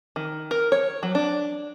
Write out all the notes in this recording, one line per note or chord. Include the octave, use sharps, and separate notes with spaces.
D#3
A#4
C#5
F#3
D4